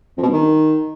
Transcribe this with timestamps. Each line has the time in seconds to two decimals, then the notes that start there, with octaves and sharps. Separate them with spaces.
0.18 F2
0.23 B2
0.28 G2
0.33 D#3